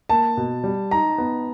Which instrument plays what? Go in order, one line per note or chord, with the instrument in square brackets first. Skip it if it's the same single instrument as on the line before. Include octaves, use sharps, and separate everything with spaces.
[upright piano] A#3 [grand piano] A5
[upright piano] B2
G3
[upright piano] D#4 [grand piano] A#5
[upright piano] B3